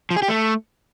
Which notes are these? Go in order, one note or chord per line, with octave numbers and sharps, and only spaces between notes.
F3
G#4
G4
A3